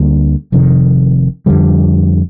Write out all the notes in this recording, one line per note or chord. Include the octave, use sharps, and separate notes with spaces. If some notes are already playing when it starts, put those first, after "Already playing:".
Already playing: D2 D3 G3 A#3
F1 F2 C3 D#3
F2 D3 G3